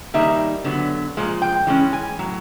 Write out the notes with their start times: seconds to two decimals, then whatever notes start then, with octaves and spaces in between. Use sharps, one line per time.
0.14 D#3 G3 A#3 D#4 E5
0.64 D3 F#3 B3
1.17 A#2 F3 G#3
1.42 G5
1.67 E3 G#3 C#4
1.93 G#5
2.19 A2 F#3